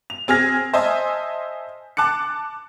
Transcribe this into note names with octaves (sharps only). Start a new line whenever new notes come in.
F7
C4 G#4 F6 A#6
C5 D#5 E5 G#5 A5
A5 D6 F#6 C#7